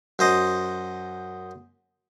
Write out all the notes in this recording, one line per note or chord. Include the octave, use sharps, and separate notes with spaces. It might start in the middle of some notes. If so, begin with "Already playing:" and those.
F#2 C5 D#5